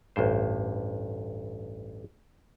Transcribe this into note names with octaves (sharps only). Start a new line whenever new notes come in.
A1 D2 G2 C5